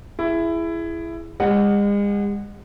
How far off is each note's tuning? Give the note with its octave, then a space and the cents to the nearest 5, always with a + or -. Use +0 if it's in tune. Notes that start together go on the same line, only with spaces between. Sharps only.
E4 +15 G#4 +0
G#3 -40 F#5 +0